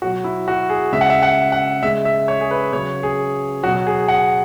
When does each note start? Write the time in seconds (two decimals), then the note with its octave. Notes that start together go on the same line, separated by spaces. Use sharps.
0.02 B2 F#3 F#4
0.24 E4
0.48 F#4
0.70 G#4
0.92 C#3 G#3 E5
1.01 F#5
1.10 E5
1.23 F#5
1.52 F#5
1.83 C#3 G#3 E5
2.05 E5
2.28 C#5
2.41 G#4
2.51 B4
2.73 C#3 F#3 C#5
3.03 G#4
3.63 B2 F#3 F#4
3.87 G#4
4.08 F#5